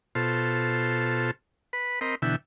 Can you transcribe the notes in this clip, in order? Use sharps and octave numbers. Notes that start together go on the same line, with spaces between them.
B2 F4 A4 C5
B4 B5
C4 A#4 D#5 B5 C6
B2 D3 E3 E5 G5